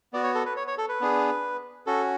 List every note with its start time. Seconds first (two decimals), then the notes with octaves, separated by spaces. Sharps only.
0.13 B3 F#4 D5
0.24 C#5
0.35 A4
0.46 B4
0.56 C#5
0.67 C#5
0.78 A4
0.89 B4
1.00 B3 D4 G#4
1.86 C#4 F#4 A4